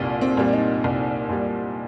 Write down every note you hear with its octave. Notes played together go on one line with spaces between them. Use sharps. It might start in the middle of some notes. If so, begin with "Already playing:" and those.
Already playing: C2 A#2 F4
C4
A#2 G3
D#4
C2
A#2 G3